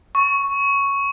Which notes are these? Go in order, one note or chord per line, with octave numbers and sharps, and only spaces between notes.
C#6